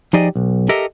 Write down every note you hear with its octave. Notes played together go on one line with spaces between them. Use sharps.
F3 D#4 G4 G#4 D5 D#5
B1
G4 A4 A#4 D#5 E5